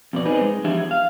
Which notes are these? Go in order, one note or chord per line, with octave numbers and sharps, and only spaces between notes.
F2 B2 D5
C4 D#4 G#4 B4
G#3
E2 F3 D4 G4 G#4 E5
F5